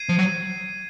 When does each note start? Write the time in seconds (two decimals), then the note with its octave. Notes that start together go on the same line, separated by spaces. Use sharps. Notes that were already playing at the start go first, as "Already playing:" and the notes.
Already playing: G#6 C7 D#7
0.09 F3
0.19 F#3